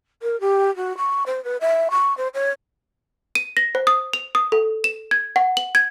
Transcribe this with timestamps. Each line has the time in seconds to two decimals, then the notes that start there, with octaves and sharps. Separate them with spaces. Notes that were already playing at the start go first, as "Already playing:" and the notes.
0.22 A#4
0.40 G4
0.76 F#4
0.97 C#6
1.26 C5
1.44 B4
1.61 E5
1.90 C#6
2.17 C5
2.34 C#5
3.35 D#7
3.57 A#6
3.75 C5
3.87 D#6
4.13 F7
4.35 D#6
4.52 A4
4.84 E7
5.11 G#6
5.36 F#5
5.57 F#7
5.75 G#6